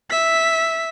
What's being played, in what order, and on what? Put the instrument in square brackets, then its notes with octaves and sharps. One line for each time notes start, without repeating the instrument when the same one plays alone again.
[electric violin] E5 B6